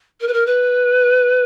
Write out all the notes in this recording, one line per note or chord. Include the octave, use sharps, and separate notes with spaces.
A#4
B4
A#4
B4